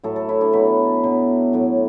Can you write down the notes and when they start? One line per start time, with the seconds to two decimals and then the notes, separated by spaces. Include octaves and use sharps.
0.03 A2 F#3 A4
0.16 A4
0.29 E4
0.41 D4
0.53 B2 F#3 B4
1.04 B2 F#3
1.53 A2 F#3